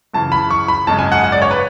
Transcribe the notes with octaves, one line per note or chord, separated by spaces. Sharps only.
F#2 C#3 E3 A5
B5
C#6
B5
G#1 F#2 C#3 G#3 A5
G#5
F#5
F#5
D5
C#5
B4